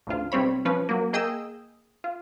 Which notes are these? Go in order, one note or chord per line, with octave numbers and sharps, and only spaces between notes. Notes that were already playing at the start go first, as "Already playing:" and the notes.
A1 D2 F4
B1 G3 C4 C#5 B5
F3 C#4 B4
F#3 A#3
A#3 G#4 D#5 G5 D#6 E6
F4